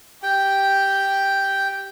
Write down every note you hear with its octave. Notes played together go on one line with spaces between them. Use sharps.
G4 G5